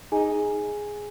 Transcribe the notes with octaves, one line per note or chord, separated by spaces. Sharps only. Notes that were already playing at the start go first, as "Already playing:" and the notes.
D#4 G#4 G#5